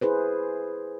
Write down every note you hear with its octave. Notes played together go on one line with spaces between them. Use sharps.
E4 G#4 B4 C5